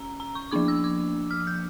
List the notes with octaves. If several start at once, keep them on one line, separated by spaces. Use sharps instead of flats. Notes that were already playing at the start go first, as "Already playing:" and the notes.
Already playing: C#4 A#5
A#5
C#6
F3 A#3 D4 D6
E6
D6
F6
G6